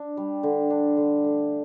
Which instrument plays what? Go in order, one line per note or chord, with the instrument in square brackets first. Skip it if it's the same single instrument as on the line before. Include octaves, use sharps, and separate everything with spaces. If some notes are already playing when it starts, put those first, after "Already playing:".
Already playing: [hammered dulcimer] D4
G3
D3
D4
D3
A3